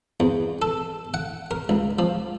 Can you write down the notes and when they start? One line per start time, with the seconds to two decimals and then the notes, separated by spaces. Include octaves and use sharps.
0.20 E2
0.62 A4
1.14 F#5
1.51 A#4
1.69 C#2
1.99 F3